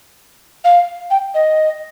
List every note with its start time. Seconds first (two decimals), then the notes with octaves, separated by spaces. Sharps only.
0.64 F5
1.10 G5
1.34 D#5